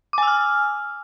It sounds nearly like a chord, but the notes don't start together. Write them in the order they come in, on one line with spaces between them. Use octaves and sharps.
D6 G#5 E6 F6